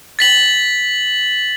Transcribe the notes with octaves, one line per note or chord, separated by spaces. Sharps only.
A6 B6 F#7